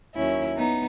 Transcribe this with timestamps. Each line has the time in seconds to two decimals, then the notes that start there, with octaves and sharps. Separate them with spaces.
0.15 D#2 D#3 F#3 C#4 E4
0.57 B3 D#4